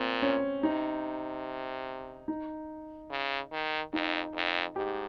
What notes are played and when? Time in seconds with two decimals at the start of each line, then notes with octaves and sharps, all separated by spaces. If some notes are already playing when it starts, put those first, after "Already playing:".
Already playing: A#2 C4
0.22 C#4
0.63 C3 D#4
2.28 D#4
3.11 C#3
3.52 D#3
3.93 F2 D#4
4.35 F2
4.76 G#2 G4